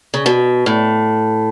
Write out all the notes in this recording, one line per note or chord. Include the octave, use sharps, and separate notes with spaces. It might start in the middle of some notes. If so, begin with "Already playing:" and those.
C#3
B2
A2